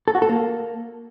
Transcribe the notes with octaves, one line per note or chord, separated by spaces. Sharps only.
A4
F#4
A4
A#3